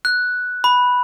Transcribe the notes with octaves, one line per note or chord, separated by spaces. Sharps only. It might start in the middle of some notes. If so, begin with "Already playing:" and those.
F#6
B5